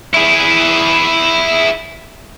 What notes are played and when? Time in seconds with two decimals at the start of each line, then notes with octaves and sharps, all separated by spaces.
0.14 E4 G#4